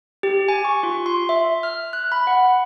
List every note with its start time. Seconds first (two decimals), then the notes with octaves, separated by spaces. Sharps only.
0.23 G4
0.48 G#5
0.64 C#6
0.83 F4
1.06 C6
1.29 E5
1.63 F6
1.93 F#6
2.12 B5
2.27 F#5